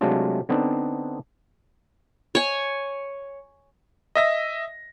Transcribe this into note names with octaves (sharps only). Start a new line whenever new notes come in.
C3 F#3 G#3 A3 D4 F4
D3 B3 C4 D4 D#4
C#5 G#5
D#5 E5 A#6